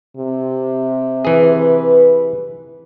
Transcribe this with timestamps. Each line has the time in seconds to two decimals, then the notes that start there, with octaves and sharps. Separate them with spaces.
0.17 C3
1.25 E3 G#4 B4